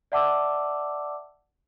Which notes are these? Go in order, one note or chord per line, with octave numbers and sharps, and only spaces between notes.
D5 E5 F#5 A5 D6 E6